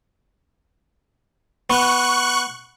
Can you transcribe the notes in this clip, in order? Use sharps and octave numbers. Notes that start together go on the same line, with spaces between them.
B3 C#6 F#6